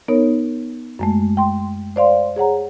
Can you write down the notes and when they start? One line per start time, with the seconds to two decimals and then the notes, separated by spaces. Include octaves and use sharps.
0.08 B3 D#4 A#4 C#5
0.99 F#2 G#3 A3
1.37 G5 C6
1.96 C5 D5 F5 C6
2.36 G#4 C#5 F#5 A#5